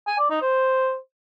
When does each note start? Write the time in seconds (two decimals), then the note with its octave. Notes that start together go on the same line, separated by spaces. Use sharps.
0.07 G#5
0.19 D5
0.30 D#4
0.41 C5